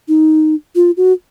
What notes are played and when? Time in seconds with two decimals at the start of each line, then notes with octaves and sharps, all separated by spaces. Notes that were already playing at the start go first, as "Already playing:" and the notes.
0.08 D#4
0.76 F4
0.97 F#4